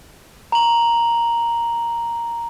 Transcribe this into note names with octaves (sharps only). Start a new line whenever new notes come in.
A#5 F#7